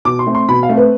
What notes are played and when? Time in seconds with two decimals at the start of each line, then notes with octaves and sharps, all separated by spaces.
0.05 B2 D6
0.19 C6
0.26 A3 C4
0.35 C6
0.48 B2 B5
0.63 F5
0.69 A3 C4
0.77 B4